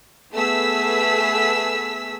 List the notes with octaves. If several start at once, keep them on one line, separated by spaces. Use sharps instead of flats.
A3 B3 G#4 E6 B6